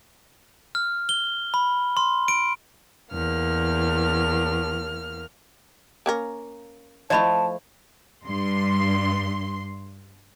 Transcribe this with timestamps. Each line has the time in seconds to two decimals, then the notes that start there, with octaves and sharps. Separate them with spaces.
0.75 F6
1.09 G7
1.54 B5
1.97 C6
2.28 D7
3.12 E2 A#3 F6
6.06 A#3 C#4 A#4
7.10 F3 A3 E4 D5 D#5 A5 B5
8.25 G2 C6